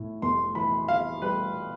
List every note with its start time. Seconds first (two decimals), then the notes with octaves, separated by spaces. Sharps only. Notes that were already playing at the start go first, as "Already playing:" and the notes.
Already playing: A2
0.22 F1 C6
0.55 E3 B5
0.88 E3 F5
1.22 G3 B4